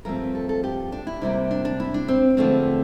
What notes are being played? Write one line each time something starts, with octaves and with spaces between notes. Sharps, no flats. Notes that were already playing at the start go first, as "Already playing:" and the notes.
G2 F3 A3 C4 A#4
A4
A4
G4
D4
E4
C3 G3 A#3 D4
D4
D4
E4
D4
C4
E2 D3 F3 A3 C4